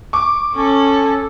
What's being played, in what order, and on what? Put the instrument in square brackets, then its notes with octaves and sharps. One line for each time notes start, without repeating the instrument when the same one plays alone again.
[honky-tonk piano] C#6 D6
[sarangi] C#4 [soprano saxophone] A4